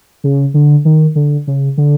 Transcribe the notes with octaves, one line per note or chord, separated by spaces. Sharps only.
C#3
D3
D#3
D3
C#3
D3